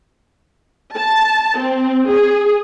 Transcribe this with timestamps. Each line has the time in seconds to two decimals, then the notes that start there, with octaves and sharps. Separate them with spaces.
0.97 A5
1.58 C4
2.09 G#4